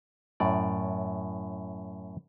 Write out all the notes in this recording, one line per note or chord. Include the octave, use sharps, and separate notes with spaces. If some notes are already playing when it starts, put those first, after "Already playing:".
F#2 A2 D5